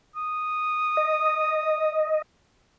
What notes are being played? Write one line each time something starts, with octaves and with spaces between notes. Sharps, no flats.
D#6
D#5